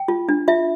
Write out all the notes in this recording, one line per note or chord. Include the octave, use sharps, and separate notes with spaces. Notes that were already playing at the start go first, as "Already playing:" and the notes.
Already playing: G5
F4
D4
F4 E5